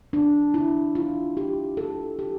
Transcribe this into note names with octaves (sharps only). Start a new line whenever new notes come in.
D4
E4
F4
G4
A4
G4